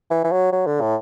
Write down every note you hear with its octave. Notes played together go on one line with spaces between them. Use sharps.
E3
E3
F#3
F#3
D3
A2